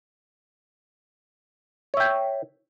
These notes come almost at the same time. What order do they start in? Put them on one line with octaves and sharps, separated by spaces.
C#5 E5 G5